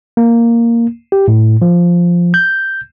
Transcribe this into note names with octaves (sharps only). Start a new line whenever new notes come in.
A#3
G4
A2
F3
G6